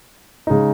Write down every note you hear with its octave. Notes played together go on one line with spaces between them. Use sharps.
C#3 G#3 D#4